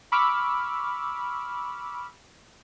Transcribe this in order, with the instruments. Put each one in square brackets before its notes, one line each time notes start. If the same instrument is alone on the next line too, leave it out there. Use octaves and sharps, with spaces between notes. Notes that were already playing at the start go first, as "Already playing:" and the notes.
[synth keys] B5 C#6 D6 E6 F6